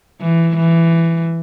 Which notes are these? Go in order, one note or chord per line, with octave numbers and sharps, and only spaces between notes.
E3
E3